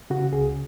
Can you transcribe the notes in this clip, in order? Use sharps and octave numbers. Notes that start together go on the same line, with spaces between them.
C#3 F#4
C#2 G#4